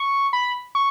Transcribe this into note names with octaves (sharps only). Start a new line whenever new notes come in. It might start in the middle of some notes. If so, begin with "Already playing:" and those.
Already playing: C#6
B5
C#6